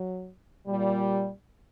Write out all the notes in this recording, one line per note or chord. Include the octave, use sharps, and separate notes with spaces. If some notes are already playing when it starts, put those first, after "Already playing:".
Already playing: F#3
A#2 G3